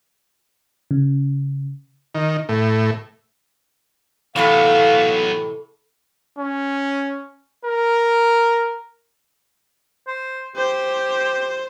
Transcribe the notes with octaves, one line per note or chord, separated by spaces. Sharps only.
C#3
D#3
A2
A2 C3 E3 F#3 B3 A4 F5 C#6
C#4
A#4
C5
G4 C5